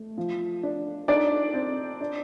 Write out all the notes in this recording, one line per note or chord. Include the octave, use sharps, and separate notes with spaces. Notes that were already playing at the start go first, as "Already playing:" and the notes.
Already playing: A3
F3
D4
D4 D#4 D5
C4
D4